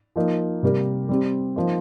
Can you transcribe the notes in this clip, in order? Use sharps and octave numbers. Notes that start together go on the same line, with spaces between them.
F3 A#3 D#4
C3 G3 A#3 G4 A#4
G3 C4 G4
F3 A#3 D#4 C5